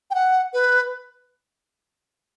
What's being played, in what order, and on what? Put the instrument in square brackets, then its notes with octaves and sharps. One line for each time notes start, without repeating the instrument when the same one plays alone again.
[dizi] G5
F#5
B4